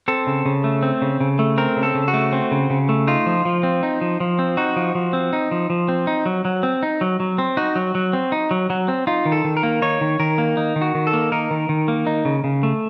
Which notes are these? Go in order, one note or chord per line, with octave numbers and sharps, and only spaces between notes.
C4 A4
C#3
C#3
A3
C4
C#3
C#3
A3
C4 A#4
C#3
A4
C#3
F#4
A3
C4
C#3
C#3
A3
D#4 F4
F3
F3
C4
D#4
F3
F3
C4
D#4 F#4
F3
F3
C4
D#4
F3
F3
C4
D#4
F#3
F#3
C4
D#4
F#3
F#3
C4
D#4 F#4
F#3
F#3
C4
D#4
F#3
F#3
C4
D#4 F4
D#3
A4
D#3
A#4
A#3
D#4 C#5
D#3
D#3 A#4
A#3
D#4
D#3
F#4
D#3
A4
A#3
D#4 A#4
D#3
D#3
A#3
D#4
C#3
C#3
A3